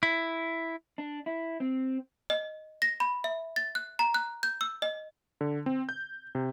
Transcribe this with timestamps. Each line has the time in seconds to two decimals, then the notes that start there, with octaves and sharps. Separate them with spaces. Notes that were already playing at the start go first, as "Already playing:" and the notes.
0.03 E4
0.98 D4
1.26 E4
1.60 C4
2.30 D#5
2.82 A#6
3.00 B5
3.24 E5
3.56 A6
3.75 F#6
3.99 A#5
4.14 F#6
4.43 G6
4.61 E6
4.82 D#5
5.41 D3
5.66 C4
5.89 G6
6.35 C3